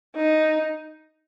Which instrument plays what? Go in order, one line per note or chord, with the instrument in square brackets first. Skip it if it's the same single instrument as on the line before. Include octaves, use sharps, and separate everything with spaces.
[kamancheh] D#4